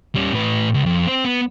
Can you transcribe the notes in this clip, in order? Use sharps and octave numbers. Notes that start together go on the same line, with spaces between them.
G3 C#4
A2 B4
C#2
F2
C4 C5
B3